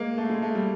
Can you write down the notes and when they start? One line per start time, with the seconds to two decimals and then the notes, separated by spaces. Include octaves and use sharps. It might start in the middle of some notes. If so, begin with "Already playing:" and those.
Already playing: G#3 A#3
0.17 A3
0.30 G#3
0.42 A3
0.55 G3